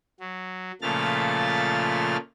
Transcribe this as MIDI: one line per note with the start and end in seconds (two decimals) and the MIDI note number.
0.20 0.72 54
0.82 2.17 46
0.82 2.17 49
0.82 2.17 53
0.82 2.17 57
0.82 2.17 89
0.82 2.17 93